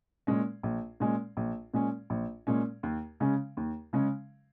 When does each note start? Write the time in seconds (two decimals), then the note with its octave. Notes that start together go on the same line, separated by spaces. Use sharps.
0.27 A#2 G#3 C#4
0.63 A#1
1.00 A#2 G#3 C#4
1.37 A#1
1.74 A#2 G#3 C#4
2.10 A#1
2.47 A#2 G#3 C#4
2.83 D#2
3.20 C#3 G#3 C#4
3.57 D#2
3.93 C#3 G#3 C#4